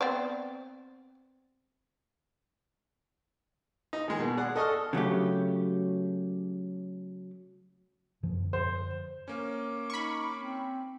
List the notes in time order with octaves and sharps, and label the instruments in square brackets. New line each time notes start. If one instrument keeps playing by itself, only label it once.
[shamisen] B3 C4 D5
[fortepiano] D#4
D#3 G#3
B2
G#4 D5 F#5
A4 D#5 C#6 D#6 F6
[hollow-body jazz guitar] C#3 F#3 A3 G4
[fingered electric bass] F#2 D3 F3
[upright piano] C5
[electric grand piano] A#3 C#4 [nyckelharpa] D6
[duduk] D#4 [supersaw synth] B5 C#6
[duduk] C4